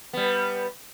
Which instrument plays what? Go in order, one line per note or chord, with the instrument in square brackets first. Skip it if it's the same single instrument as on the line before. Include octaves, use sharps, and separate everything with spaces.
[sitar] G3 B3